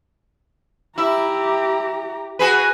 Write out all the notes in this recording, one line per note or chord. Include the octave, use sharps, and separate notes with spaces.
E4 G4 A#5
F#4 G#4 B4